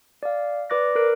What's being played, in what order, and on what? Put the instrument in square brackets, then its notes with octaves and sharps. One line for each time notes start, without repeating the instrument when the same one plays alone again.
[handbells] D5 F5
B4 D5 D6 F#6 A#6
A#4 F#6 D7